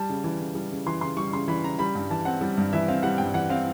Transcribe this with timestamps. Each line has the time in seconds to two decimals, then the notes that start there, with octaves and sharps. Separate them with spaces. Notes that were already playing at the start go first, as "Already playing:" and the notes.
Already playing: G3 A5
0.09 C#3
0.24 E3
0.40 C#3
0.55 G3
0.71 C#3
0.86 E3 C6
1.01 C#3 C6
1.17 G3 C#6
1.33 C#3 C6
1.48 E3 B5
1.64 C#3 A#5
1.79 G3 B5
1.95 G2
2.10 E3 A5
2.25 C4 F#5
2.41 G3
2.57 G2
2.73 E3 E5
2.88 C4 F5
3.03 G3 F#5
3.18 G2 G5
3.34 E3 F#5
3.50 C4 F5